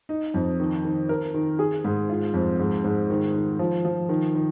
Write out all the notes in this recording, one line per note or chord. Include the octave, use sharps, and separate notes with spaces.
D#4
F2
D#3
D#3
A#4
D#3
G#4
G#2
F4
F2
G#2
G#2
D#3
D#3
F3
F3
D#3
D#3